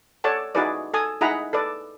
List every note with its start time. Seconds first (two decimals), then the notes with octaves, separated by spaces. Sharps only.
0.24 A4 C#5 D5 F#5 A5
0.55 D#4 E4 F#4 G#4 B4 D5
0.94 A4 G#5 D#6
1.21 D#4 E4 G#4 F#5 A#5 B5
1.53 A4 B4 D5